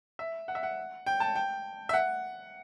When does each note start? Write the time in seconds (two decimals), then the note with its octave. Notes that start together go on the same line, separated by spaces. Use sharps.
0.19 E5
0.48 F#5
0.55 E5
0.63 F#5
1.06 G5
1.20 A5
1.35 G5
1.89 E5
1.93 F#5